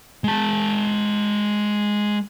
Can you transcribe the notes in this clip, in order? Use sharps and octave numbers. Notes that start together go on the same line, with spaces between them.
G#3 A5